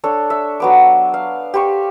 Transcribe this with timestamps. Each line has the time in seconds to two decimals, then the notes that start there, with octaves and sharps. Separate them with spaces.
0.04 D4 A4 C#5
0.30 E5
0.60 F#3 B3 D6
1.14 F5
1.54 G4 C5 C#6